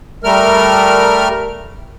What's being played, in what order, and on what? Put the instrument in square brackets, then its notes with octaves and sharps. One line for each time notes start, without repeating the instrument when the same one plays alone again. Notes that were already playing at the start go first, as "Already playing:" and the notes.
[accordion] G3 A3 A#4 F6